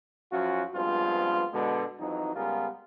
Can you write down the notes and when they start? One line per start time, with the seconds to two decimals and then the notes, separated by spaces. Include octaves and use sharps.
0.32 F#2 F3 C#4 F4 F#4
0.75 G2 F3 G#3 B3 C4 F4
1.53 B2 D3 G#3
2.00 F2 E3 F#3 D#4
2.35 C#2 G3 B3 F4 G#4 A#4